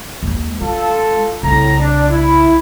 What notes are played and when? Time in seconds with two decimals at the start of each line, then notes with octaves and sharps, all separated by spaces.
0.23 D#2 G#3
0.61 G#3 F4 A4
1.43 C2 A2 C#3 A#5
1.78 D4
2.10 E4